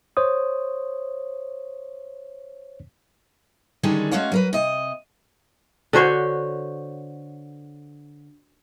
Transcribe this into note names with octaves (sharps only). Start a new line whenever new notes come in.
C5 C#5 D#6
D3 D#3 G3 G#3 C#4 G#4
G#3 A3 C#4 F#4 C#5 F5
F#3 A#4 B4
C3 D#5
D3 F#4 C5 C#5